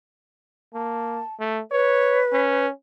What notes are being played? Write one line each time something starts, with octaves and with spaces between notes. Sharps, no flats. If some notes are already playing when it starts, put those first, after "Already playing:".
A#3 A5
A3
B4 C#5
C#4